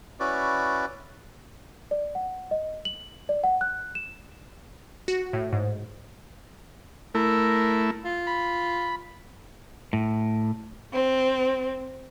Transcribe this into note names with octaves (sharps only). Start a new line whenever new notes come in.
C#4 E4 F#4 B4 D5
D5
F#5
D#5
F#7
D5
F#5
F#6
E7
F#4
A2
G#2
A3 E4 A#4
F4
B5
A2
C4